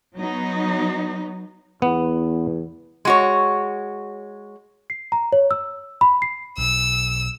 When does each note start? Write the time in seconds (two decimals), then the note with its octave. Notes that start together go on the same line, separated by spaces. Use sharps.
0.16 F#3 B3 D#4
1.82 E2 B3
3.05 G#3 F#4 C#5
4.90 C7
5.12 A#5
5.32 C#5
5.51 E6
6.01 B5
6.22 C7
6.58 B1 E6